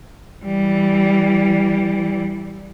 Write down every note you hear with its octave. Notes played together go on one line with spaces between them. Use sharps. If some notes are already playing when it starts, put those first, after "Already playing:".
E3 G3